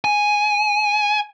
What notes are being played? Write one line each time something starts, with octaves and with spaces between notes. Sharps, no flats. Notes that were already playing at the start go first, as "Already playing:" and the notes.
G#5